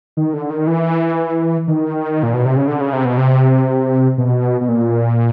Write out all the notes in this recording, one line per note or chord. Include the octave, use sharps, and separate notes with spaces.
D#3
D3
D#3
E3
D#3
A#2
B2
C3
C#3
D3
C#3
C3
B2
C3
B2
B2
A#2